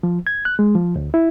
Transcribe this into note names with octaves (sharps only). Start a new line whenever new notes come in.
F3
G#6
F#6
G#3
F3
D2
E4